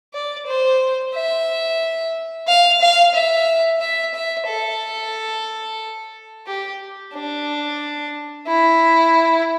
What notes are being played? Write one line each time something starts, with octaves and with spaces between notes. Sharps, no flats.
D5
C5
E5
F5
F5
E5
E5
E5
A4
G4
D4
E4